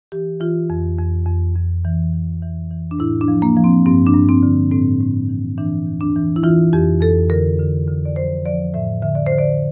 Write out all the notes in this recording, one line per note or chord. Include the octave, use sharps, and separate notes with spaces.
E3 G4
E3 F4
F2
F2
F2
F2
E3
E3
E3
E3
D4
A2 E4
D4
F3
A#3
F3
C4
G2 C4
D4
G2
C4
D3
A2 C4
A2
E3
E3 D4
E2
D4
E3
E4
E3 F4
F2 G4
F2 A4
D3 A#4
D3
D3
D5
F3 C5
F3 D5
A2 E5
D3 E5
D5
C5
D3
D5